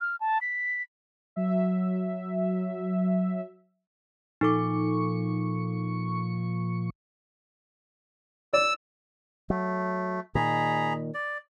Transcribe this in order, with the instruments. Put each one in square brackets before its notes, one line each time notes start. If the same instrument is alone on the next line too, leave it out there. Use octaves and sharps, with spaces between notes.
[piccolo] F6
A5
B6
[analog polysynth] F#3 E5
[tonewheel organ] A#2 F3 C#6 [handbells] D#4 A4 D6
[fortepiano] D5 [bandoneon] E6
[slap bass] F#3 [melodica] A3
[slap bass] A#2 D#3 [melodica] G#4 A#5 B5
[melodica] D5